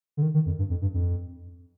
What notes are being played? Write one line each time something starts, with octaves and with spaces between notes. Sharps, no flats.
D3
D#3
D#3
F2
G2
F2
G2
F2